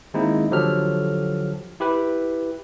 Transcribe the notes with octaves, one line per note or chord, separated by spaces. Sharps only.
D#3 G#3 A#3 C4 D#4 E4
D3 F3 F#3 G4 A4 F6
E4 G4 B4